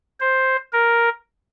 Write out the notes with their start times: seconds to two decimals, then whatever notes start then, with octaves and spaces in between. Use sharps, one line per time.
0.20 C5
0.73 A#4